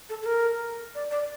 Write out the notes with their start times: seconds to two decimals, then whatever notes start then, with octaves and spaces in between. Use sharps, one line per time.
0.10 A4
0.23 A4
0.26 A#4
0.95 D5
1.11 D5